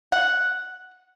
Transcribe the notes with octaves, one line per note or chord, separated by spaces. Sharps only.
F#5